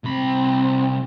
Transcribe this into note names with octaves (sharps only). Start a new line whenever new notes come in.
C2 C4 B5